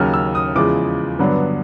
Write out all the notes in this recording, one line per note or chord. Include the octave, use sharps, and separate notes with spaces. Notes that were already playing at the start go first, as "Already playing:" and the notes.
Already playing: D#2 C#3 F#3 F6
E6
D#6
E2 C#3 F3 G#3 D6
G2 D3 F#3 B3 D4